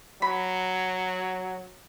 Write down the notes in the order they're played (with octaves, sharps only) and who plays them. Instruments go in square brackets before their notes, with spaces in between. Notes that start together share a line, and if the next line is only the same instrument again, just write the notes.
[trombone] F#3 [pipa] B5